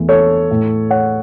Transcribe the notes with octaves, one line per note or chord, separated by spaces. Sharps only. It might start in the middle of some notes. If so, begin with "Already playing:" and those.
Already playing: E2 E3 A3
A4 C#5
A2 A3
C#5 F#5